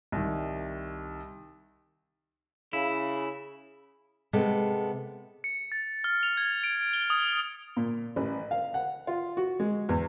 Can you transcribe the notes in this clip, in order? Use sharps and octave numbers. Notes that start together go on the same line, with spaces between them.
C2 D#3
C#3 E4
C3 G#3 B3 A4
C#7
A6
F6
F7
G#6
D7
G7
D#6
A#2
A1
F5
F#5
F4
F#4
G#3
E2